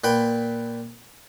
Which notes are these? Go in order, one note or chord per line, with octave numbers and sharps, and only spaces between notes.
A#2 B4 G5 B5